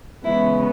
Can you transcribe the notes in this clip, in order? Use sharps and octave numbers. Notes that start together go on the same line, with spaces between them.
C#3 E3 G#3 B3 E4